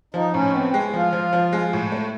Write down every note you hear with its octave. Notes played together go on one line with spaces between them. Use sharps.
F3 D#4
A2 C#4
B3 C4
G#3
F3 F4
F3
F3
G#3
A2
A3